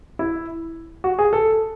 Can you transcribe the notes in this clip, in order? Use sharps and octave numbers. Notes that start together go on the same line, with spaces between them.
E4
F#4
G#4
A4